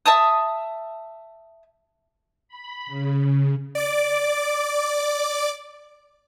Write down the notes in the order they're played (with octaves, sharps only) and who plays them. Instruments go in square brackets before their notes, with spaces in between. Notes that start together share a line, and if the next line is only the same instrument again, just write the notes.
[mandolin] E5 A5 D#6
[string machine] B5
C#3
[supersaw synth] D5 D6